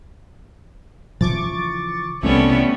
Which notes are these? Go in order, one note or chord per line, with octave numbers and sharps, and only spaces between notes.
C#3 E3 F3 C#6 D6 A6
C2 C3 E3 G3 A3 B3 C#4